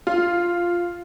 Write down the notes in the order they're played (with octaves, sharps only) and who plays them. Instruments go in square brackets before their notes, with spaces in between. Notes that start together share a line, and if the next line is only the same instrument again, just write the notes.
[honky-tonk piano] F4